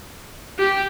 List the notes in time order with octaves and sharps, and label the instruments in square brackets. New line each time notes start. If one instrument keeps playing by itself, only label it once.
[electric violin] G4